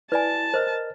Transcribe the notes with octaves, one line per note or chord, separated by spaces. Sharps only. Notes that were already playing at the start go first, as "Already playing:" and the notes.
E4 B4 D5 G#5 A5
A#4 C5 D#5 F6